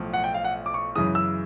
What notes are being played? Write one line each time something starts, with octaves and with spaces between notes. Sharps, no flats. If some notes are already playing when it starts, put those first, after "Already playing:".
Already playing: B1 A2 F3 A3
F#5
G5
F5
F#5
D6
C#6
F#2 C#3 E3 G#3 D#6
E6